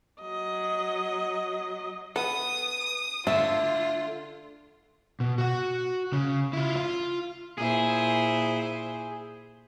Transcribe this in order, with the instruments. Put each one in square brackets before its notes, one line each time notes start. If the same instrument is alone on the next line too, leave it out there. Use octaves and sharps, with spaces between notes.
[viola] F#3 D#5
[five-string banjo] B3 [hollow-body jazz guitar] A4 [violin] D#6
[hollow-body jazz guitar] D3 A5 [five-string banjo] A3 [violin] F4 [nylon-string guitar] E5
[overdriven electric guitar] B2
F#4 F#5
C#3
E4 F4
F4
[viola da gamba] A#2 E4 C5 [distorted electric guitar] G#4